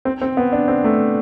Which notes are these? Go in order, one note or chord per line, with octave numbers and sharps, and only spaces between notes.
C4
C4
B3
D4
C4
A3